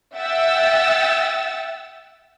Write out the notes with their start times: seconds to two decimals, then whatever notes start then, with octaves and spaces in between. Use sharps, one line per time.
0.15 E5 F#5 G5 E6 A6